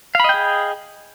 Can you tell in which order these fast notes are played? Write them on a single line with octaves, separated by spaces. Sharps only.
F5 B5 D#5 G5 G#4